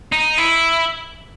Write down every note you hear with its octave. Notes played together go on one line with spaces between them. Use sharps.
D#4
E4